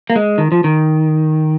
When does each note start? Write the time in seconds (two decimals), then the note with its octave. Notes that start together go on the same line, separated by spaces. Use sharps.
0.10 A#3
0.16 G#3
0.38 D#3
0.52 F3
0.64 D#3